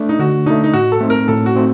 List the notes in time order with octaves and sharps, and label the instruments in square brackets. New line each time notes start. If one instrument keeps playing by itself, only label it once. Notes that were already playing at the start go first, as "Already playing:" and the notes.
Already playing: [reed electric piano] A3 D4
[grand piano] D#4
[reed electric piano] D3 [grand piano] F#4
[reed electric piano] A3 D4 [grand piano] D#4
[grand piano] D#4
[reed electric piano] A2 [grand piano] F#4
[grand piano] A4
[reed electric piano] A3 C4 D#4
[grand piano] A#4
[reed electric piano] A2 [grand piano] A4
[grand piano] F#4
[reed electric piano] A3 C4 D#4